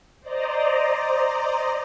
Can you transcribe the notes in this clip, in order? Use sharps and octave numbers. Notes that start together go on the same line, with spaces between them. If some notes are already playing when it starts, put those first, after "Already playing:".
C5 D5 D#5 A#5